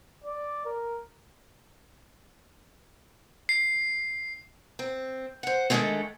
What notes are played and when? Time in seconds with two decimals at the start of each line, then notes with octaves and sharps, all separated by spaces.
0.24 D5
0.66 A#4
3.49 C7
4.79 C4
5.43 C5 F#5
5.70 D3 D#3 F#3 G#3 A3 C4